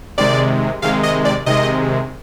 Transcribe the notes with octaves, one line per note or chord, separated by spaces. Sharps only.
C3 D#3 G#3 D5
C3 D#3 G#3 F5
D#5
D5
C3 D#3 G#3 D#5